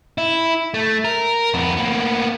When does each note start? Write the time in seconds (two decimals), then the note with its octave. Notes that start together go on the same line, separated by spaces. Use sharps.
0.18 E4
0.74 A3
1.05 A#4
1.54 F2 B3
1.77 A#3 B3